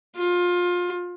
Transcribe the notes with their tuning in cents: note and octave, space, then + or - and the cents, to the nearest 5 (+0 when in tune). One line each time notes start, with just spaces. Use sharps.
F4 +25